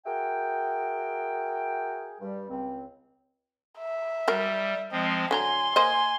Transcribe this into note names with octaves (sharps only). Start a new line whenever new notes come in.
F#4 G#4 A#4 E5 G5
G2 G3
C#2 C4
E5
F#3 G3 A#4
F3 G#3 C4 D#5
D3 F#3 G#5 A#5 C6
A#3 C5 D#5 G#5